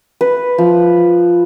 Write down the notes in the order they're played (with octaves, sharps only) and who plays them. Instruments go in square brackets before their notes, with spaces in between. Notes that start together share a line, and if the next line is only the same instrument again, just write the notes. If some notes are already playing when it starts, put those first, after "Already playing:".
[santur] B4
F3